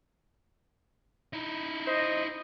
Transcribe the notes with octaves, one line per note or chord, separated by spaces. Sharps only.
D#4 E4
C5 D#5